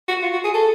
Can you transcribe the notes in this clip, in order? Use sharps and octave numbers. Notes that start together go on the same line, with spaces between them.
F#4
F4
F#4
G#4
A4